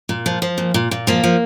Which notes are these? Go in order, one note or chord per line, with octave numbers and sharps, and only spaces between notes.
A#2
F3
F3
A#2
A#2
A#2
F3 A#3
F3